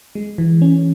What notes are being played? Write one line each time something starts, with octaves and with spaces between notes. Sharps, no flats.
G#3
E3
C#4